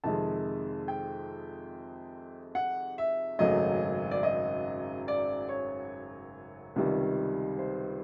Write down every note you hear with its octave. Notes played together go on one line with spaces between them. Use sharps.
F2 C3 D#3 G#3 A5
G5
F#5
E5
G#1 F#2 C#3 F#3 A3 D#5
D5
D#5
D5
C#5
C#2 C3 D#3 G3
C5